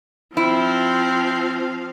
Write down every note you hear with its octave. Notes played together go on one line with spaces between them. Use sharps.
F3 C4 E4 F5